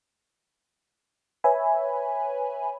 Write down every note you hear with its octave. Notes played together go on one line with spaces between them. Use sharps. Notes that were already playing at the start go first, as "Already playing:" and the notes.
B4 C#5 E5 G#5 B5